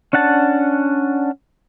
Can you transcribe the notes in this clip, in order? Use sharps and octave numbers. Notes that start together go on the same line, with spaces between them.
C#4 D4 F#5 A5